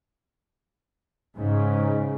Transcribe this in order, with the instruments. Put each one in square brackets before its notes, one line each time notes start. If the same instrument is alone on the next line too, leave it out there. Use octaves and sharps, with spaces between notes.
[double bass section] G#2 C#3